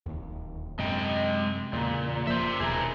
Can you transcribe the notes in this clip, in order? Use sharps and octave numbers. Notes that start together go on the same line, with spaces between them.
D1 D#2
F#2 C3 G#3 D#5 G5
E2 A#2 C#3
F1 F3 A#3 C5 E5
D#1 D#2 B2 G#4 A#4